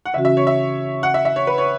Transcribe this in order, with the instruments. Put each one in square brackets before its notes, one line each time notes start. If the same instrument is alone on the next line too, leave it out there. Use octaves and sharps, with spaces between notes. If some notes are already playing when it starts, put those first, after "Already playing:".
[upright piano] F#5
[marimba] C#3 E3 C#4 F#4 [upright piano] E5
[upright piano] E5
C#5
E5
F#5
E5
E5
C#5
B4
C#5